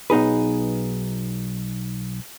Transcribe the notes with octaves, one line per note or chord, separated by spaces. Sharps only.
B1 B3 D#4 G#4 B4